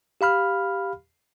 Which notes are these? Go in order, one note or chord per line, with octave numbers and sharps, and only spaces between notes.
G4 F5 B5 F6